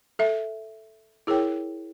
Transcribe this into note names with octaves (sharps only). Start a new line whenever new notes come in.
A4 E5
E4 G#4 A#4 C#5 G5